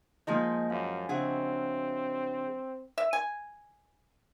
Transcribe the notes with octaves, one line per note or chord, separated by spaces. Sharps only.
F3 G#3 A#3 D#4 D#5
F#2 F5
C#3 C4 D4 F#4 E5 G#5
E5
G#5